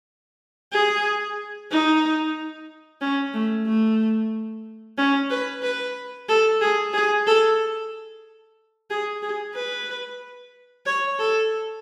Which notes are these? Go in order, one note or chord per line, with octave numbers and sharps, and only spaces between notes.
G#4
D#4
C#4
A3
A3
C#4
B4
B4
A4
G#4
G#4
A4
G#4
G#4
B4
C#5
A4